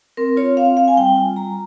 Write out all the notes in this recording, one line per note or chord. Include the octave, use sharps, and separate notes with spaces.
C4 A#4
F4 C#5
C4 F5
C4 F5
G#5
G3 G5
F4 G#5
G3 A#5